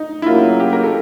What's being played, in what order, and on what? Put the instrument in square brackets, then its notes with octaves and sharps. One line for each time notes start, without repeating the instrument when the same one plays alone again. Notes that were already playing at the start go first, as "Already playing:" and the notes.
Already playing: [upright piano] D#4
E4
[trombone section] C#3 F#3 A#3 [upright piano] F4
[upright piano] G4
A#4
A4